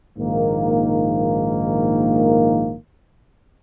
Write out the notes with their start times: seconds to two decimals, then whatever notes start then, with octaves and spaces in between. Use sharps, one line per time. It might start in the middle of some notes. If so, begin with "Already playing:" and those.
0.17 A#1 G#2 D#3 A#3